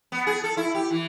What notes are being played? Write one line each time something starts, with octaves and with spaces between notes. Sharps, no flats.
B3
G#4
A4
E4
G4
E3